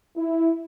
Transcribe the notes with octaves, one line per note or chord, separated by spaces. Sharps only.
E4